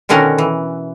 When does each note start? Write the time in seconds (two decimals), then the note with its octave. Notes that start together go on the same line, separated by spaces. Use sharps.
0.09 B2 D3 D#3 C#4 A#4 F#5
0.38 E3